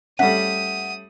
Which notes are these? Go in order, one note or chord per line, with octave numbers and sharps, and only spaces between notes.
G3 A3 C#4 E5 F#5 D#6 B6